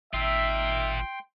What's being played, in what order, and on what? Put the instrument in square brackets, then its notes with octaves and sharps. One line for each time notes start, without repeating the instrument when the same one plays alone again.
[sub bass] G#1 [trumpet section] D#4 E5 [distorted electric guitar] F4 A#4 [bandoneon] G5 C6